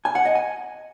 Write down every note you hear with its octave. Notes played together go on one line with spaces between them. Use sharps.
G#5
F#5
D#5
G#5